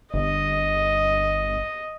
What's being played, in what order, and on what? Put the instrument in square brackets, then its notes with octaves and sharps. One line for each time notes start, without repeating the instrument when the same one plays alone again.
[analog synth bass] G1 [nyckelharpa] D#5